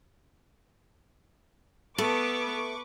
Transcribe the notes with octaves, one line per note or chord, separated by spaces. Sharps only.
A3 B3 A4 B4 C#6 D6